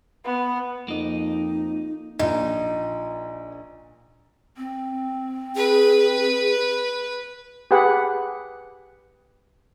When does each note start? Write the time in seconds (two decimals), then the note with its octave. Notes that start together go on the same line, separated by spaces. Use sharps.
0.25 B3
0.88 F2 A#3 D#4 D#5
2.19 A#1 A#2 D#4
4.57 C4
5.56 G#4 B4
7.71 G4 G#4 B4 F#5